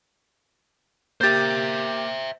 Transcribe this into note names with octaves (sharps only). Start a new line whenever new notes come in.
A#3 G4 C5 E5 G6 A6